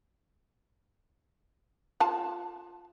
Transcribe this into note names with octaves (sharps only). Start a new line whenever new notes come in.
F4 A5